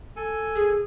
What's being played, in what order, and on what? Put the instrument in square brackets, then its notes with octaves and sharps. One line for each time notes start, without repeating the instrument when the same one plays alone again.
[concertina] A4 G#5
[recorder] G#4